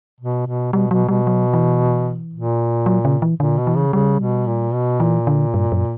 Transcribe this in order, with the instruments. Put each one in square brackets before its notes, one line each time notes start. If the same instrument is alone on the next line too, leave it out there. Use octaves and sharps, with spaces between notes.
[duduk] B2
B2
[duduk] B2 [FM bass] G3
[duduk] B2 [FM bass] F#3
[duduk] B2 [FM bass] G3
[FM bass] F#3
E3
[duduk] A#2
[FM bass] F#3
C#3
E3
[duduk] A#2 [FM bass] D3
[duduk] B2
[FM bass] E3
[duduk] C#3
[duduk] C#3 [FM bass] G3
[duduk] B2
A#2
B2
[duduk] A#2 [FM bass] E3
[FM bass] D3
G2
F#2